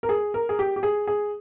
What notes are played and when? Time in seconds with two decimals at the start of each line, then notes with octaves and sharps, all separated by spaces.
0.03 A#4
0.09 G#4
0.34 A#4
0.49 G#4
0.59 G4
0.76 G4
0.83 G#4
1.07 G#4